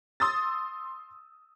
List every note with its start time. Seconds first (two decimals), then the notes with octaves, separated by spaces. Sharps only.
0.20 C6 D#6 E6 A6